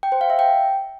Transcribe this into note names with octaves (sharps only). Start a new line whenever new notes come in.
G5
C5
F5
E5
G5